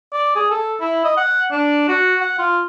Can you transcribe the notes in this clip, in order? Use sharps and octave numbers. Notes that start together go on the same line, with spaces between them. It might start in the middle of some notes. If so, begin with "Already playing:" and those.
D5
G#4
A4
E4
D#5
F#5
D4
F#4
F#5
F4